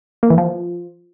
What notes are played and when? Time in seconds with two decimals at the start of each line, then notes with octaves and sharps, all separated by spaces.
0.23 A#3
0.30 E3
0.38 F3